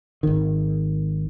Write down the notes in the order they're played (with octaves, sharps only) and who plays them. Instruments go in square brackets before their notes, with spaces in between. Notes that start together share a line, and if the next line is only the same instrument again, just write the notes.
[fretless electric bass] G#1 D#3